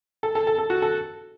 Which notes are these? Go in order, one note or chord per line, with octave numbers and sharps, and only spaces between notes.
A4
A4
A4
A4
F#4
A4